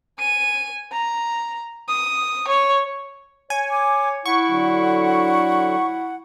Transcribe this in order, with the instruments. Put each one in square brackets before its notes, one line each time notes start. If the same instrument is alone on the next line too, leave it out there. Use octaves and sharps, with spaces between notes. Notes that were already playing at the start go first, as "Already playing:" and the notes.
[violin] G#5 D#7
A#5
D#6
C#5 C#6
[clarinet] C#5 [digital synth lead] G#5
[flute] D6
[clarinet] E4 [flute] F#5 [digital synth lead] C#6
[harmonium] D3 F#3